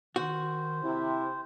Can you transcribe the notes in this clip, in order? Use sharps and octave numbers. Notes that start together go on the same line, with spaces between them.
D#3 F#4 C5
C3 E4